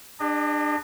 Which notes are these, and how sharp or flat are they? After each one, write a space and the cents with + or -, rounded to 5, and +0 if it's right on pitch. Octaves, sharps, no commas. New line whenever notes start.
D4 +20 G#4 -40 D#5 -35